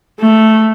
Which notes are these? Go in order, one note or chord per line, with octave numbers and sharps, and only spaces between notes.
A3